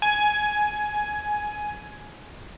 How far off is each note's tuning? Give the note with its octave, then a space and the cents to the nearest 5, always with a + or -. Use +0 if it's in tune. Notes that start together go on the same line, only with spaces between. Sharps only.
G#5 +10